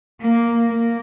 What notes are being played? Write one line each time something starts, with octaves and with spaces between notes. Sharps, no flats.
A#3
A#3